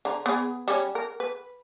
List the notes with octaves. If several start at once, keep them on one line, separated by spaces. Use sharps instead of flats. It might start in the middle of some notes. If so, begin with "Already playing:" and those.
D3 A#5
B3 G#4
G3 C#4
A#4
B4